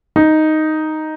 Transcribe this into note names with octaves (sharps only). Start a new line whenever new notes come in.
D#4